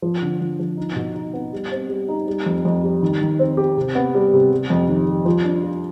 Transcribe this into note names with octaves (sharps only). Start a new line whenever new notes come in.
F3
D3
F3
F3
D#4
B2
D#4
B3
G3
C4
G3
D#4
G3
F2
F2
G3
D#3
D#3
C4
G4
C3
B3
G3
C3
G3
F2
D#3
G3
F3
D4
F4